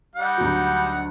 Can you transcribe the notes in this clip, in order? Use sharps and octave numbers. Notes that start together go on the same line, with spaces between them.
G3 D#4 F#5
D2 F#3